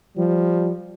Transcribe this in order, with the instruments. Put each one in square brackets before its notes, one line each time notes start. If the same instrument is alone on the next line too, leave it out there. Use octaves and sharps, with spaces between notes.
[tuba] F3 [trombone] G3